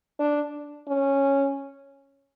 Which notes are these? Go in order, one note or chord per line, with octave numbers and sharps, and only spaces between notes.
D4
C#4